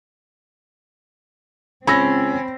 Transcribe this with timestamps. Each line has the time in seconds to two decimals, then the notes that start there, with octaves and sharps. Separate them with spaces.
1.87 C#2 C4 C#4 B5 E6 A#6